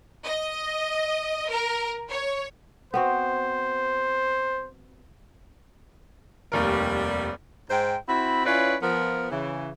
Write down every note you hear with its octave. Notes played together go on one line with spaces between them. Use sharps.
D#5
A#4
C#5
B3 C4 F#4 C5
F1 D#2 G3 A#4
G#2 D#4 C5 G5
C4 E4 F#4 B5
C#4 E4 F4 B4 C#5 D5
F3 B3 A#4
C#3 E3